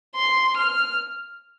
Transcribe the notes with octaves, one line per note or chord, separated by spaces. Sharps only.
C6
F6